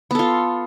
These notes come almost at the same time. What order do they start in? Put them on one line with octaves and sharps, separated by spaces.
B3 A4 F4